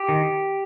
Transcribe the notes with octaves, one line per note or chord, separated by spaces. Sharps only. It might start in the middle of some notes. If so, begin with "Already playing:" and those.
Already playing: G4
D#3